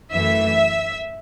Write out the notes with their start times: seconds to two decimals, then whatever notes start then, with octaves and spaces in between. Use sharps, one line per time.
0.12 F#2 E3 A3 E5